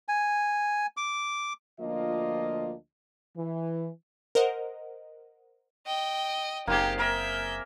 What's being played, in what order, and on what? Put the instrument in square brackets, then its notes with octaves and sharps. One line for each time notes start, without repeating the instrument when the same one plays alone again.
[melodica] G#5
D6
[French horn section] D2 F3 A#3 D4 F4 D#5
E3
[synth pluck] A#4 C5 D#5 F#5
[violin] D#5 G5
[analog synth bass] F#1 [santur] A#3 C4 G#4 [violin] D#4 G4
[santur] A#4 [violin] E5 G6